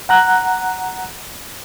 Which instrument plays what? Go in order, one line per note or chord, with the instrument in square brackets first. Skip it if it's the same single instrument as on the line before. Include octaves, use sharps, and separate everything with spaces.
[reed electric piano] F#5 A#5 F#6